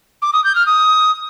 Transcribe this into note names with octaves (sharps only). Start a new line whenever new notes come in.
D6
D#6
G6
F6
D#6